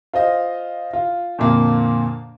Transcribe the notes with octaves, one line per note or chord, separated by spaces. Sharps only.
F4 C5 D#5
F4
F2 A#2 D3 A#3